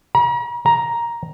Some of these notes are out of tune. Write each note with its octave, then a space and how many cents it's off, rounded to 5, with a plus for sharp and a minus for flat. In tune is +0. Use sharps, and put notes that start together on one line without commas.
A#5 +45
A#5 +10